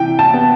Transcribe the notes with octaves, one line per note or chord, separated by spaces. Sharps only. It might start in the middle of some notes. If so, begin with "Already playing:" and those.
Already playing: C3 E3 G5
A5
B3